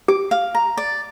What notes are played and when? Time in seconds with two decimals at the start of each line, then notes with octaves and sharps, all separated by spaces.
0.08 G4 D6
0.31 F5
0.55 A#5
0.77 D5